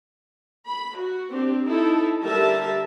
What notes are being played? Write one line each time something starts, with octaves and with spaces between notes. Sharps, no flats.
B5
F#4
C4 D4 G4
D#4 E4 A4
D3 G3 A#4 E5 A5